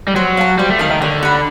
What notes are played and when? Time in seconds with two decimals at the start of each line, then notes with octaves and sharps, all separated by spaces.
0.08 G3
0.16 F#3 C5
0.37 F5 A5
0.58 G3 C5
0.70 A3
0.79 D#3 F5 A5
0.90 D#3
1.01 D3 C#5
1.23 F#5 B5